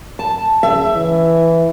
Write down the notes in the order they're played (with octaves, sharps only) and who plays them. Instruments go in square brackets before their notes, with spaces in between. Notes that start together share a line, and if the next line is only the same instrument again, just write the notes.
[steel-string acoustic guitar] A5
[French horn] C#3 [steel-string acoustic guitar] E5
[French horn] E3